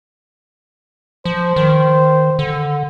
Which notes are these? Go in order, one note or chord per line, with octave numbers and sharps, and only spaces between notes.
F3 C5
D#3
D3